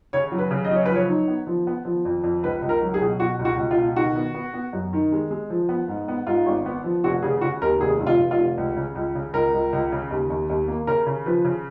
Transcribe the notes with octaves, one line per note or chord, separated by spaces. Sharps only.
C#3 C#5
F#3
B4
C#3
D#5
F#3 C#5
F3 B4
C#5
D#4
B3
F3
B3
F3
F2
F2
C#2 B4
C#2
A#4
F#3
G#4
B2
B2 F#4
C#2
F#4
C#2
F4
B2
D#3 F#4
B3
B3
B3
F#2
D#3
G#3
G#3
F3
B3
G#2
B3
G#2 F4
G#1
B3
F3
F1 F#4
C#3 G#4
C#3 F#4
D#2 A#4
F1 G#4
F1
F4
F1
F4
F1
C#2
C#3
C#2
C#3
C#2 A#4
C#2
C#2
C#3
D#2
D#2
D#2
A#3
C#3 A#4
C#3
F3 B4
C#3